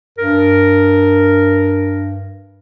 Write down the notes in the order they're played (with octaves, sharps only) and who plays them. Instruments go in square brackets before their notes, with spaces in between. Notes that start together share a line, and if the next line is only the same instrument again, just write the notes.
[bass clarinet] G2 [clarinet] A#4